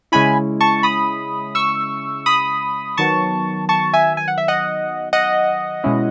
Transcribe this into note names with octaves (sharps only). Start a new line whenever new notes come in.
C#3 G#3 C#4 E4 G#5 B5
A5 C#6
B5 D#6
C#6 E6
B5 D#6
D#3 F#3 B3 A5 C#6
A5 C#6
E5 G#5
G#5
F#5
E5
D#5 F#5
D#5 F#5
B2 G#3 C#4 E4